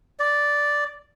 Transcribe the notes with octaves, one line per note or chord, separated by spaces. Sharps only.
D5